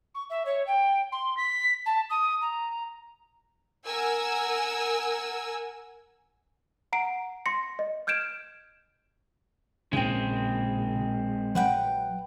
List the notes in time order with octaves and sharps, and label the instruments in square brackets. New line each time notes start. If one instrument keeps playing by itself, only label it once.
[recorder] C#6
E5
C#5
G5
C6
B6
A5
D#6
A#5
[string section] A#4 F#5 G#5 E6
[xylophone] F#5 A#5 C7 D7
C6 A#6 C#7
D#5
F6 G6 G#6 D7 E7
[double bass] A#1 [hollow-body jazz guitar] C#3 D#4 G5 [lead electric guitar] G#3 C4
[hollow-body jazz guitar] F#3 [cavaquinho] B4 F#5 G5